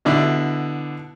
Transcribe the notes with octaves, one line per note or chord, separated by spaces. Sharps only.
B2 D3 E4 D5